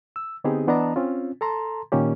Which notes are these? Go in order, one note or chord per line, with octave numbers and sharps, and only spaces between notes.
E6
D3 B3 C4 D#4 G4 G#4
E3 B3 D4 D#5 A5 A#5
C4 C#4 F4
A4 A5 A#5 C6
A#2 D#3 A#3 C#4 G4